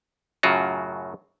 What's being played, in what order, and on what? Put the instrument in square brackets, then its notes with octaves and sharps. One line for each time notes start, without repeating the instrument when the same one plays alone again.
[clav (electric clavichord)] F#2 A2 C#3 F#3 F4 F#4